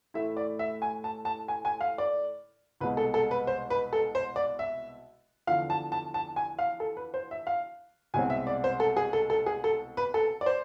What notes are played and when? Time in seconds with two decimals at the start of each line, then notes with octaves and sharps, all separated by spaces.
0.14 A2 E3 A3 E4 E5
0.37 D5
0.59 E5
0.82 G#5
1.04 A5
1.25 A5
1.48 G#5
1.65 G#5
1.81 F5
1.98 D5
2.81 C2 B2 G#3 B4
2.97 A4
3.14 A4
3.31 B4
3.47 C5
3.70 B4
3.93 A4
4.15 C5
4.36 D5
4.59 E5
5.47 E2 D3 F3 F5
5.70 A5
5.92 A5
6.14 A5
6.36 G#5
6.59 F5
6.80 A4
6.97 B4
7.14 C5
7.31 E5
7.47 F5
8.14 C2 B2 G#3 C4 G#5
8.30 E5
8.47 D5
8.64 C5
8.80 A4
8.97 G#4
9.13 A4
9.30 A4
9.46 G#4
9.64 A4
9.97 B4
10.14 A4
10.41 D5
10.46 C5